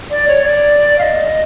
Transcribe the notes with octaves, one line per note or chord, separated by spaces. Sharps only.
D5
C#5
D5
F5
D#5